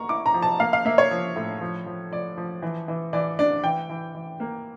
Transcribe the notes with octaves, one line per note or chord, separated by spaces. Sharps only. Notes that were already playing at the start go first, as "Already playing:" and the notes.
Already playing: A#3 A#5 C#6
E4 D6
A#5
F3
A5
A#3 F5
F5
A#3 E5
C#5
F3
A2
F3
F3
F3 D5
F3
E3
E3
E3 D5
D4 D5
E3 G5
E3
E3
A#3